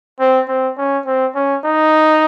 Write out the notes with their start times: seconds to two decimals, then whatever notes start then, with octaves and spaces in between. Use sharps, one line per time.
0.20 C4
0.48 C4
0.78 C#4
1.06 C4
1.35 C#4
1.64 D#4